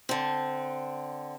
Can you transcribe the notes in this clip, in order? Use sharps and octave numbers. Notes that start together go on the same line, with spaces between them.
D3 C4